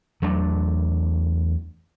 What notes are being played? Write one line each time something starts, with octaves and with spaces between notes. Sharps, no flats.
E2 F#3 A3 D4